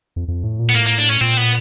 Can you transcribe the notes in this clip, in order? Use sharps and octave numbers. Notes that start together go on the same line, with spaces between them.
F2
F2
A2
A#2
B3
A2 A#3
A#3
D4
C#4
A#2 C4
B3